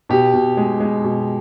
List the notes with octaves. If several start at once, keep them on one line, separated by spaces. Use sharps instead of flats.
B2 G4
B2
G#3
G#3
B2